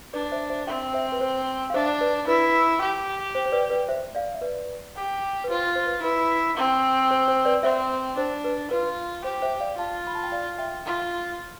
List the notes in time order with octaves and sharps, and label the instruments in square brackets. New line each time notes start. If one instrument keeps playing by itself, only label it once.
[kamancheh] D4 [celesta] B4 D5
[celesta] C5 E5
C5 E5
[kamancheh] C4 [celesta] E5 G5
[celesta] C5 E5
B4
C5
F5
[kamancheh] D4 [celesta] C5 E5
[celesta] B4 D5
[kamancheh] E4 [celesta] B4
[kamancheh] G4
[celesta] C5
C5
B4 D5
B4 D5
C5 E5
D5 F5
E5
B4 D5
[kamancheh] G4
[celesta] B4
[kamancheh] F4 [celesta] C5
[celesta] C5
B4
[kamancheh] E4 [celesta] B4
[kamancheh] C4
[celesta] C5
C5
B4 D5
[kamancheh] C4 [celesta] C5 E5
[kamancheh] D4 [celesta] C5
[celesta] B4
[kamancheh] F4 [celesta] B4
[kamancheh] G4 [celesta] C5
[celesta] C5 E5
D5 F5
[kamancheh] F4 [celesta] F5 A5
[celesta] B5
A5
G5
D5 F5
E5 G5
[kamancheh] F4